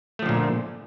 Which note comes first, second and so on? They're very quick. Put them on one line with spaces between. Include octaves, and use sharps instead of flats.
A3 F3 D3 A#2